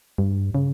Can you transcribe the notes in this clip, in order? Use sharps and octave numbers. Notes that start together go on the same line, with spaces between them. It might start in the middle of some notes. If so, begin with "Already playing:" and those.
G2
C#3